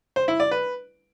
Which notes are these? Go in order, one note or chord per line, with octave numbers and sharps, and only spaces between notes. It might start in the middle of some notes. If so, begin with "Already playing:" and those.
C5
E4
D5
B4